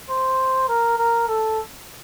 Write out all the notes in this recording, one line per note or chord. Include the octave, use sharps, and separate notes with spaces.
C5
A#4
A#4
A4